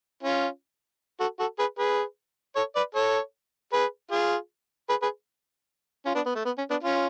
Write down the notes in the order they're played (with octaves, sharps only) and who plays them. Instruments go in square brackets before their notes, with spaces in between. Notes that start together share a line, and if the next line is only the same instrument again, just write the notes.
[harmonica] C#4 F4
F#4 A4
F#4 A4
G#4 B4
G#4 B4
A4 C#5
B4 D5
A4 C#5
G#4 B4
F4 G#4
G#4 B4
G#4 B4
C#4 F4
B3 D4
B3
A3
B3
C#4
B3 D4
C#4 F4